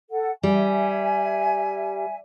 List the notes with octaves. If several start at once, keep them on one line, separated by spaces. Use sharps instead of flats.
A4 F#5
G3 E5 G#5